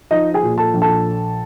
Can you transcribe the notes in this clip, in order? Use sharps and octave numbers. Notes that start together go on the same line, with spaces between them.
F3 D#4 D#5
G#4 G#5
A#2
A4 A5
A#1
A4 A5